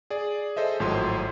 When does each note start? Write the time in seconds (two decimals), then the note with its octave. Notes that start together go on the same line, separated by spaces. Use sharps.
0.10 G#4 D5
0.57 G#4 A4 C5 D#5 E5
0.80 G#1 A2 F3 F#3 A4 C6